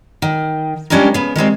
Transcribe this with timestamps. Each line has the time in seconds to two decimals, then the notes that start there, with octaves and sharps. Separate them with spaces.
0.22 D#3
0.90 G3 G#3 C#4 D4 G#4 A#4
1.14 C#3 B3
1.36 D#3 G3 G#3 C4